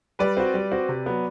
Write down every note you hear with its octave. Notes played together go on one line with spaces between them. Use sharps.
G3 B4 D5
C4 F#4
G3
C4 F#4
C3
F#3 B3